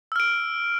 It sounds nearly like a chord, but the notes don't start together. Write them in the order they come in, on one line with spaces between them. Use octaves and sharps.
E6 F6 D7